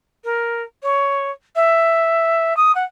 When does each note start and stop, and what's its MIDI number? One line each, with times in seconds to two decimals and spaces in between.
0.24 0.63 70
0.83 1.31 73
1.55 2.56 76
2.57 2.72 87
2.75 2.84 78